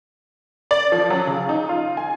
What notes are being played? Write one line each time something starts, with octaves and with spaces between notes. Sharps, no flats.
D5
F3
F#3
C#3
D#4
F4
G#5